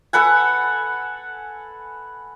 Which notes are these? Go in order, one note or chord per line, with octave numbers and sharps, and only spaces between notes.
A4 B4 F#5 G#5